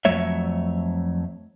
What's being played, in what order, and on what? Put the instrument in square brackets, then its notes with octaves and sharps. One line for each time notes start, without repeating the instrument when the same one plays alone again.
[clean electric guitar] F2 F#3 A3 C#5 E5